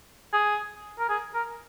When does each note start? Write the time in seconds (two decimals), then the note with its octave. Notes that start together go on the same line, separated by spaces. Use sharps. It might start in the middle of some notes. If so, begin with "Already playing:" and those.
0.33 G#4
0.99 A#4
1.09 G#4
1.34 A#4